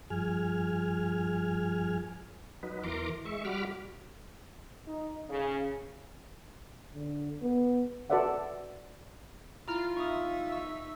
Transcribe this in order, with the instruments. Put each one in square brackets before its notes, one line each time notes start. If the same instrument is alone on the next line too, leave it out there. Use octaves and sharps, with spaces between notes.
[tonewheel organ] G2 F3 G#4 G#5 F6
F#3 D#4 B4
E2 E3 A#4 A#5 C6 D6
G#3 E5 C#6
G3 F#4 B5 D6 F6
[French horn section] D#4
C#3
[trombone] D3
B3
[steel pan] F#4 A4 B4 D5 E5 F#5
[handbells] E4 A#5 F6 [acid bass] F4
[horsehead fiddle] D#4 E5 [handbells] C#6 D#6
[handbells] C#6 E6